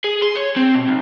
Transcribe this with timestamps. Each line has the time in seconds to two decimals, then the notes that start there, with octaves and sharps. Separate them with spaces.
0.04 G#4
0.22 C6
0.36 C#5
0.56 C4
0.74 B2
0.88 B1